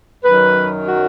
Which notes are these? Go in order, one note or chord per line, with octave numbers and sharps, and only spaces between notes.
F#2 D#3 F#3 B4
F#4